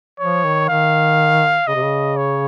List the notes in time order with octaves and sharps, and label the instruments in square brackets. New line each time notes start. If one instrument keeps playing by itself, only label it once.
[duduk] F3 [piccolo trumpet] C#5
[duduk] D#3
[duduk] D#3 [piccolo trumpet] F5
[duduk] C#3 [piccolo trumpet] D#5
[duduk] C3
C#3
[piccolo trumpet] C#5